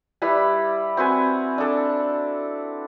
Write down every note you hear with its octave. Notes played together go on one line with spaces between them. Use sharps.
G3 E4 B4 B5
C4 F#4 B4 G#5
D4 A4